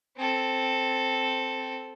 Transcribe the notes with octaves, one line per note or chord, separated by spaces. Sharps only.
C4 A4